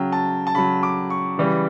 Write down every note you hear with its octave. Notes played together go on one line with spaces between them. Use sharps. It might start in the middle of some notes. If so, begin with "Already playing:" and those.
Already playing: C#3 F#3 G5
A5
A5
C#3 F#3 B5
D6
C#6
C#3 E3 G3